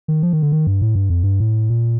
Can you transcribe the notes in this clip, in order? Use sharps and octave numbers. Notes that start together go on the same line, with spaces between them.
D#3
F3
D#3
D3
D#3
G2
A2
G2
F2
G2
A2
A#2